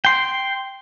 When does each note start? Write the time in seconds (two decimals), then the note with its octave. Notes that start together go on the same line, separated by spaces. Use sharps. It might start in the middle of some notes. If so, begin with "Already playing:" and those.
0.05 G5 C6